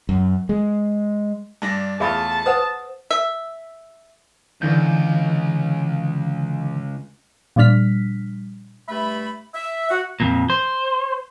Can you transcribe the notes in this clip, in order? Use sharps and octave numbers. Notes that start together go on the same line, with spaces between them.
F#2
G#3
G2 D4 A#6
E2 A3 F4 G#4 E5 A5 B5
B4 C5 F#5 D#6 E7
E5
C#2 D3 E3 G6
A#2 F3 G3 D4 F6 B6
G2 A3 E5 B5
E5
F#4 F#5
F2 A#2
C5